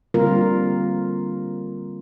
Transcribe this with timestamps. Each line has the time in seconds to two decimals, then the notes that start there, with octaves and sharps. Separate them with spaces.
0.14 D3 G3 A#3 C4 F4 A#4